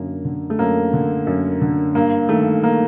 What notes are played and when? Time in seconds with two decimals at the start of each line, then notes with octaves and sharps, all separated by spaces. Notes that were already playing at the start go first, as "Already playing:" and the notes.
Already playing: F#2 D3 A#3
0.25 D3
0.50 A3
0.59 F#2 A#3
0.93 D3
1.27 F#2
1.61 D3
1.95 G2 A#3
2.29 D#3 A3
2.63 A#3